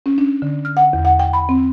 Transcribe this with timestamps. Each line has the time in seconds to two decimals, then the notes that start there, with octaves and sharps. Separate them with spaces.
0.06 C#4
0.18 D4
0.42 D3
0.65 F6
0.77 F#5
0.93 E2
1.05 F#5
1.20 G5
1.33 B5
1.49 C4